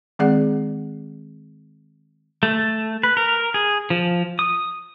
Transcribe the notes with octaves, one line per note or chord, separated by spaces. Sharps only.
D#3 G#3 C4 G#4 D5 F#5
A3
B4
A#4
G#4
F3
D#6